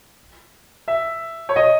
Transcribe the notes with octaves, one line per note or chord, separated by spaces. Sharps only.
E5
C#5
D#5